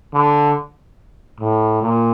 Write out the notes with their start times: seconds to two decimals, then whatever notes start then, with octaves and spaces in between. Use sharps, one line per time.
0.14 D3
1.40 A2
1.82 A#2